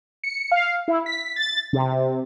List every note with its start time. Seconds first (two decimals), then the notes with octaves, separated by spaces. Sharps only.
0.24 C#7
0.52 F5
0.88 E4
1.06 B6
1.36 A6
1.73 C3